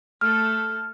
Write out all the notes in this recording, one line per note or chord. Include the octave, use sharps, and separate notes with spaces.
A3 A4 F6